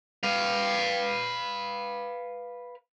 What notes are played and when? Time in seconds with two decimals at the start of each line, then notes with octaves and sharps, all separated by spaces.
0.23 B4 F5